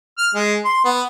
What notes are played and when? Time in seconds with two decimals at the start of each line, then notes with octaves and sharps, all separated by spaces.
0.18 F6
0.35 G#3
0.65 C6
0.85 B3